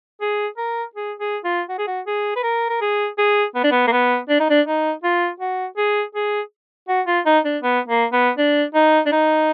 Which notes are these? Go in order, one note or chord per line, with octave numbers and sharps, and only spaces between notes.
G#4
A#4
G#4
G#4
F4
F#4
G#4
F#4
G#4
B4
A#4
A#4
G#4
G#4
B3
D4
B3
A#3
B3
D4
D#4
D4
D#4
F4
F#4
G#4
G#4
F#4
F4
D#4
D4
B3
A#3
B3
D4
D#4
D4
D#4